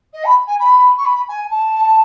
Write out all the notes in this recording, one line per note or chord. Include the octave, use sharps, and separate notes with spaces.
D#5
B5
G#5
B5
C#6
B5
G#5
A5